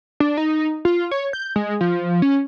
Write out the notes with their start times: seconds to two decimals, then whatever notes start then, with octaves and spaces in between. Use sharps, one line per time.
0.20 D4
0.37 D#4
0.85 F4
1.11 C#5
1.33 G6
1.56 G#3
1.81 F3
2.22 C#4